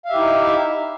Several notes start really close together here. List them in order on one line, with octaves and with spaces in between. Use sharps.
F5 E5 G4 E4 D#4